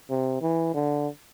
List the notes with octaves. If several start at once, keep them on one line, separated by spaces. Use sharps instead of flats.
C3
E3
D3